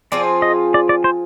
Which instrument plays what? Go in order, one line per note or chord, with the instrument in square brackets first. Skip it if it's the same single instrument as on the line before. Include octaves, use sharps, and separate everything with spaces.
[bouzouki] F3 C4 F4 G#4 [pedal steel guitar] D5
[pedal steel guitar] D#5
D5
D5
C5